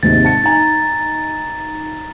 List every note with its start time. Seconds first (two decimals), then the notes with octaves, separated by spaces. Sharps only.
0.03 D#2 G#2 C3 A6
0.25 A5 C#7
0.44 D#4 G#5 A#5 A6